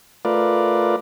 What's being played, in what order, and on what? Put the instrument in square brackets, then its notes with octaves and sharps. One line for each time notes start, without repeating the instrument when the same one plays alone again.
[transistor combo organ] A3 F4 A#4 B4 D5